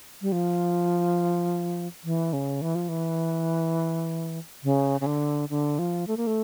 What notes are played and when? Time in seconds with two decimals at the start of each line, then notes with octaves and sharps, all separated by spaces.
0.22 G3
0.32 F3
2.04 E3
2.33 C#3
2.62 E3
2.75 F3
2.89 E3
4.64 C#3
5.01 C#3
5.06 D3
5.50 D3
5.79 F3
6.07 A3
6.17 A#3
6.27 A3